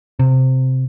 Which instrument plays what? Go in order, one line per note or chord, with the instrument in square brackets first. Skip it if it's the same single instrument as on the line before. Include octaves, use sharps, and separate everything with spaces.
[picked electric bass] C3